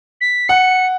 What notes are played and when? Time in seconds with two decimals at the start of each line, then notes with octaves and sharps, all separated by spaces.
0.21 B6
0.49 F#5 C#7